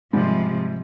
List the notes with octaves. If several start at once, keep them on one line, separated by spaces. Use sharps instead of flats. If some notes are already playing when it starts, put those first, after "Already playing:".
G#2 C3 F3 G3